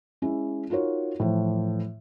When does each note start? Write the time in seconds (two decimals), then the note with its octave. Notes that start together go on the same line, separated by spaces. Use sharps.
0.22 G#3 C#4 E4
0.70 D#4 F4 F#4 A#4 C#5
1.20 A2 E3 F3